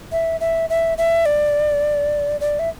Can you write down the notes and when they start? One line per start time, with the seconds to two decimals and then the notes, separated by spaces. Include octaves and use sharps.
0.12 E5
0.40 E5
0.70 E5
0.98 E5
1.26 D5
2.41 D5
2.59 E5